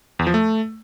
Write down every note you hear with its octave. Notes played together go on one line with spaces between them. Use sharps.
E2
F3
A3